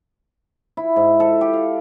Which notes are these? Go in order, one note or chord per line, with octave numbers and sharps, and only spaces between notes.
E4
G#2
A4
G4
F5